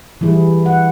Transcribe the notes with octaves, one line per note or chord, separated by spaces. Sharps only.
E3 G3 E4 G#4
F#5